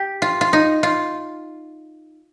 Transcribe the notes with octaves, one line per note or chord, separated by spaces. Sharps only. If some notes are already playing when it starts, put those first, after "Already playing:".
Already playing: G4
F4
F4
D#4
F4